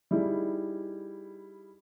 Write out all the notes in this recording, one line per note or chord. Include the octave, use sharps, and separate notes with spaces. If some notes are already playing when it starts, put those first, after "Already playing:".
G3 D#4 E4 G#4